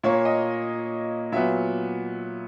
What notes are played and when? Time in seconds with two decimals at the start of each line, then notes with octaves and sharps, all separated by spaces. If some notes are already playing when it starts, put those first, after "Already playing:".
0.04 A#2 A#3 C#5
0.25 D#5
1.32 A#2 F#3 B3 E5